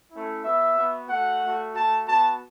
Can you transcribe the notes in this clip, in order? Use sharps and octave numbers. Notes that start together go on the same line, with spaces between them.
A3 C#4 E4
B3 F#4 E5
B3 F#4
A3 F#4 F#5
A3 F#4
A3 F#4 A5
B3 F#4 A5